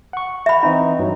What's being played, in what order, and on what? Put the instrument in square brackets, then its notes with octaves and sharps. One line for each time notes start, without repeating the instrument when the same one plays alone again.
[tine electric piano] F#5 C#6
[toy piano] E5 B5
[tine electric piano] E3 C4 D#4
G2 F#3